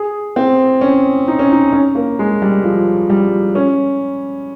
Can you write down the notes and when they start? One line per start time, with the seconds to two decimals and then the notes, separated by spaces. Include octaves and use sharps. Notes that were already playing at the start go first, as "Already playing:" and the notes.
Already playing: G#4
0.36 C4
0.81 C#4
1.28 D#4
1.39 C#4
1.52 D#4
1.73 C#4
1.95 A#3
2.19 G#3
2.42 G3
2.64 F3
3.10 G3
3.55 C#4